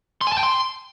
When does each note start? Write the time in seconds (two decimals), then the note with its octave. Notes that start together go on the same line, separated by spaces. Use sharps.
0.21 C6
0.27 G#5
0.32 A5
0.38 G5
0.43 C6